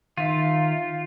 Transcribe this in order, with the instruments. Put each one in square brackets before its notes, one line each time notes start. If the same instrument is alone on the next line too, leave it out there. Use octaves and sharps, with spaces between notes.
[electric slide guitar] D#3 D#4 E5 [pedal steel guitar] F4